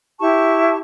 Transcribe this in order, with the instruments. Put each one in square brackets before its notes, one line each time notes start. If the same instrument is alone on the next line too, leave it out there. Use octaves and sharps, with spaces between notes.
[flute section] E4 G4 A5 C#6